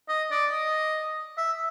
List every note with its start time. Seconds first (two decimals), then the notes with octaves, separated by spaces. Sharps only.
0.09 D#5
0.31 D5
0.52 D#5
1.37 E5